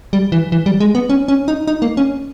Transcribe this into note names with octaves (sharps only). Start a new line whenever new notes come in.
G3
E3
E3
G3
G#3
B3
C#4
C#4
D#4
D#4
A#3
C#4